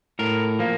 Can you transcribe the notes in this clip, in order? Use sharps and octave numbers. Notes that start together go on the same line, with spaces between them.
A2 A#4
F3 A#3